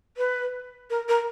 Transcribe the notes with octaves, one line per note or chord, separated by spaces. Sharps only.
B4
A#4
A#4